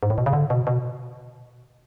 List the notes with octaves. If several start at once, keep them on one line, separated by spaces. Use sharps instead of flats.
G#2
A2
B2
C#3
D3
B2
B2